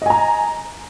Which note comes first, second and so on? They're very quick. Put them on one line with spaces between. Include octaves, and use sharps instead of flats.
D#5 G#5 A#5